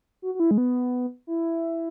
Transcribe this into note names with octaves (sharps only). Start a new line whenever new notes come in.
F#4
F#4
E4
G#3
B3
E4